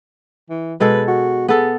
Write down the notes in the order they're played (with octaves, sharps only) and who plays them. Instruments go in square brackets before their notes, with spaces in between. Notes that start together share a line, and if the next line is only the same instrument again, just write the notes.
[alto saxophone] E3
[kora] B2 G#3 A4 [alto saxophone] B4
[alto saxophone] F#4
[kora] B3 A4 [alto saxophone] G#4